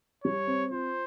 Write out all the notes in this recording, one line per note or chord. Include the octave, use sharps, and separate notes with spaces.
G3 C#5
C4
F4 C5